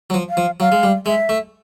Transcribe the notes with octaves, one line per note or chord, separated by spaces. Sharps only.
F#3
F3
F5
F3
F#3 F5
G#3
G3
G#3 E5
A3